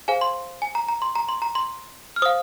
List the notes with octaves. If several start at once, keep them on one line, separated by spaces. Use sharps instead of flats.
G#4 C5 F5 G#5
C6
G#5
A#5
A#5
C6
A#5
C6
A#5
C6
F6
C5 F5 D#6